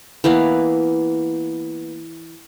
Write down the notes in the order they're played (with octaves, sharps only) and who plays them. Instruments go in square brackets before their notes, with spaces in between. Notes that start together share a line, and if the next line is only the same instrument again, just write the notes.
[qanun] E3 A#3 B3 F5